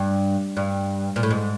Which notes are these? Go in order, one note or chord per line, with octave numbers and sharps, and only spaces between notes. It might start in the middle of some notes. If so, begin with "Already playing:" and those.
Already playing: G2
G2
A#2
A2
G#2